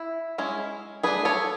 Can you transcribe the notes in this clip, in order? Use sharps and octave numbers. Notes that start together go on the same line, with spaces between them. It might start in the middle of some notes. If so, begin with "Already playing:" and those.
Already playing: E4
G#3 C#4 E4
A3 D4 G#4 B4
A4 C#5